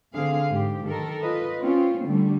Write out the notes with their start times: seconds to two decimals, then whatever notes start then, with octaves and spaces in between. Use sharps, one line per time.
0.15 D3 C4 G#4 F5
0.51 G#2 G4
0.87 D#3 A4 A#4
1.22 F4 B4 D#5
1.60 C4 C#4 F4
2.06 D3 G3 A3